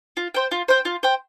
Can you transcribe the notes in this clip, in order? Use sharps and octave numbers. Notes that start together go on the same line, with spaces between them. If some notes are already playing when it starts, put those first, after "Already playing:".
F4
C5 G5
F4
C5 G5
F4
C5 G5